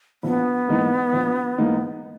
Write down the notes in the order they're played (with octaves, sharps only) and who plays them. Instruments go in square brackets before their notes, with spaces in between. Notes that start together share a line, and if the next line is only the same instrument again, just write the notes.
[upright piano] A#1 [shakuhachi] B3
[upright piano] G#2 E3 A#3 D#4
A#1
G#2 E3 A#3 D#4